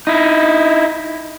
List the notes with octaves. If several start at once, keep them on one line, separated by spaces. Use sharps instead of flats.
D#4 E4